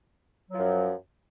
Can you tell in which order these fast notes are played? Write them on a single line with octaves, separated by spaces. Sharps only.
F#3 F3 F#2